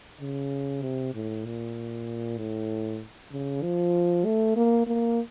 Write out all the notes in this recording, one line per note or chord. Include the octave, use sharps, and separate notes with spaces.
C#3
C3
A2
A#2
A2
C#3
F3
A3
A#3
A#3